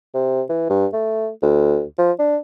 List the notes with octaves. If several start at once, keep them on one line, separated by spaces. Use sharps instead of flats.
C3
E3
G2
A3
D2
F3
D4